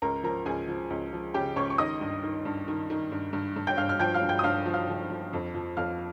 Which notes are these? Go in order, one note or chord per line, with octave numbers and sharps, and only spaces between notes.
C#2 A#4 A#5
F3 A#4 A#5
C#2 G#4 G#5
F3
C#2
F3
C#3 G4 G5
C#2 C#5 C#6
C#6
D#3 D#5 D#6
G2
D#3
G2
D#3
D#3
G2
G2
G2
G5 G6
G2 F5 F6
F6
F3 G5 G6
F5 F6
G2
G5 G6
D#6
G2 F5 F6
F3
F5 F6
F3
F3
F2
F3
F2 F5 F6